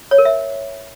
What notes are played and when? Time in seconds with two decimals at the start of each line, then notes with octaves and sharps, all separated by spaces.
0.11 C#5
0.18 A#4
0.25 E5